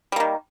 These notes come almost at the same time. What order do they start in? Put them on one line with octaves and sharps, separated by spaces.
G3 A#3 D#3